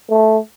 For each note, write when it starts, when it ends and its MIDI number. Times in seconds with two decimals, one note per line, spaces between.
0.10 0.39 57